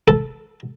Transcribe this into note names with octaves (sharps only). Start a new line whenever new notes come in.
A4